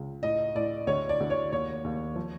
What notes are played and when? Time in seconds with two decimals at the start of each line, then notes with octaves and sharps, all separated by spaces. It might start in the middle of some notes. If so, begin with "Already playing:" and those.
Already playing: C#2
0.22 A2 D#5
0.55 A2 D5
0.87 D2 C#5
1.09 D5
1.20 D2
1.30 C#5
1.52 D#2 C#5
1.84 D#2
2.16 F3